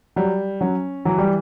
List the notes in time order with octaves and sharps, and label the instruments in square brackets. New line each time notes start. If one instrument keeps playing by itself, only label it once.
[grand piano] F#3 [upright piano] G3
[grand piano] F#3 [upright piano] C#4
[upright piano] E3 [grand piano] F#3
[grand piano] G3